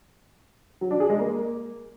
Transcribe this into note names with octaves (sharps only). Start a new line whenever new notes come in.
F#3
D4
G#4
G#3
A#3